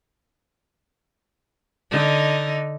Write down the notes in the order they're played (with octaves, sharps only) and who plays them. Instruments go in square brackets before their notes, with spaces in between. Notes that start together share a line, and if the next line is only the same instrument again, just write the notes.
[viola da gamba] D3 D#4